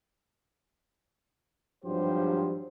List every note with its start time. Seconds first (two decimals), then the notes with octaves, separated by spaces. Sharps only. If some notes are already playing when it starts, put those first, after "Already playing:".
1.84 G#1 G2 F3 F#3 G4 C5